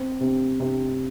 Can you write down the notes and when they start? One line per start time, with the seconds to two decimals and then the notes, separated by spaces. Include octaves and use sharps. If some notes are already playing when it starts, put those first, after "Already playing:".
Already playing: C4
0.20 C3
0.60 C3